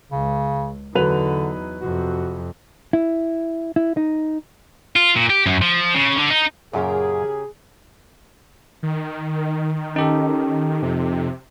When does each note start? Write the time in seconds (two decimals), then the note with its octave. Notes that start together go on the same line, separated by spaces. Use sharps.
0.12 C#2 C#3
0.95 E2 D3 F#3 D#4 B4 F7
1.81 F2 C3 F#4
2.93 E4
3.76 E4
3.97 D#4
4.96 F4
5.16 A#2
5.30 G4
5.46 F#2
5.62 F3
5.95 C#3
6.17 D3
6.31 D#4
6.73 F#2 A#2 C#3 G4 G#4 A#4
8.83 D#3
9.96 C#4 D#4 G4 A4
10.82 F2 C3